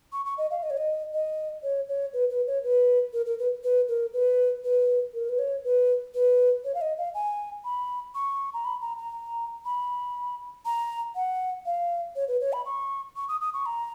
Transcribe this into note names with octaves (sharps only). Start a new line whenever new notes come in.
C#6
C#6
D#5
F5
D#5
C#5
D#5
D#5
C#5
C#5
B4
B4
C#5
B4
A#4
A#4
B4
B4
A#4
B4
B4
A#4
B4
C#5
B4
B4
C#5
F5
D#5
F5
G#5
B5
C#6
A#5
B5
A#5
A#5
B5
A#5
F#5
F5
C#5
B4
C#5
B5
C#6
C#6
D#6
D#6
C#6
A#5